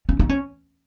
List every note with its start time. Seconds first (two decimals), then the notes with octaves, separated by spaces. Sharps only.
0.09 C#4
0.19 D#4
0.29 C#4